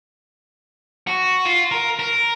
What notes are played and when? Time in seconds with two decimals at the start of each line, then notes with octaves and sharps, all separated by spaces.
1.07 F#4
1.46 F4
1.72 A#4
1.99 A#4